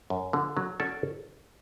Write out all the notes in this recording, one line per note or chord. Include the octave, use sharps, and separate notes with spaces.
F#2
D3 F3
F#3
C#4 F#4 A4 D5